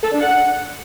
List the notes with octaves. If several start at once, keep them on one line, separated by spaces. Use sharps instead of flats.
A4
D4
F#5